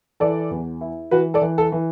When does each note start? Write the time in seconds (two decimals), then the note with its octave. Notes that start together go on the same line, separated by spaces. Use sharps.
0.20 E3 A4 D5
0.51 E2
0.81 E4
1.11 E3 F#4 B4
1.34 A4 D5
1.42 E3
1.58 A4
1.72 E3